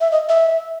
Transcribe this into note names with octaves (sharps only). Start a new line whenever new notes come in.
E5
D#5
E5